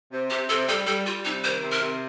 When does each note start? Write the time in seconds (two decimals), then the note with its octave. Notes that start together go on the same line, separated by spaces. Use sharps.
0.12 C3
0.30 C3 G4
0.49 C3 A4
0.68 G3 A4
0.87 G3 A4
1.06 G3 F4
1.25 C3 D#4
1.44 D#3 C5
1.62 C3
1.72 A#4
1.81 C3